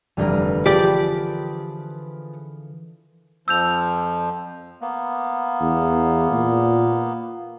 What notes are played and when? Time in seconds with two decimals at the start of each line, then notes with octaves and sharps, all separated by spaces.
0.17 F1 G2 D3 E3 G3 A#4
0.66 F3 G4 G#4 B4 D5
3.48 F2 F3 E6 G6 F7
4.81 A#3 B3
5.61 E2
6.31 A#2